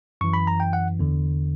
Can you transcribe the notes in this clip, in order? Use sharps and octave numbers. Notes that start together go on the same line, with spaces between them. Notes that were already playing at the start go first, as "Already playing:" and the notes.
F#2 E3 C#6
B5
A#5
G5
F#5
E2 D3